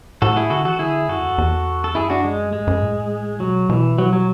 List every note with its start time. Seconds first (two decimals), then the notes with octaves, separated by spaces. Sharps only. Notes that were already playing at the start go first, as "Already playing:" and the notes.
0.22 A2 F#4 A4
0.36 E4 G#4
0.50 D3 F#4 A4
0.65 E3 F#4 A4
0.79 D3 E4 G#4
1.09 F#2 F#4 A4
1.18 E2
1.28 F#2
1.38 E2
1.84 A4
1.95 F#2 E4 G#4
2.10 D4 F#4
2.24 G#3
2.53 G#2 G#3
2.67 F#2
2.82 A2
3.40 B2 F#3
3.69 B2 E3
3.98 F#3
4.13 F#3